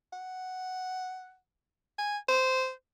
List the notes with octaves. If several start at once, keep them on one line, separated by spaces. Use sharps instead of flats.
F#5
G#5
C5